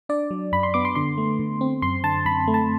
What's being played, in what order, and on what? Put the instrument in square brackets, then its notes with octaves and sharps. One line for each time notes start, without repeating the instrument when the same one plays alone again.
[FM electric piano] D4 D5
F#3
F#2 B5
C6
B3 D6
C6
D3 C6
A3
D3
C4
F#2 C6
D3 A5
F#2 B5
A3
A5